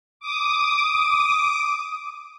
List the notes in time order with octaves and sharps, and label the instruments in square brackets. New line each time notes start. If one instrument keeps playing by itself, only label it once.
[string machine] D6 D#6